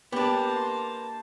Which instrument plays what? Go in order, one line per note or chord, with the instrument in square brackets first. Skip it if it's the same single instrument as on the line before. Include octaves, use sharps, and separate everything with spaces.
[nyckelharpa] A#3 A5 [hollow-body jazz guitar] B3 D4 [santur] G4
[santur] C6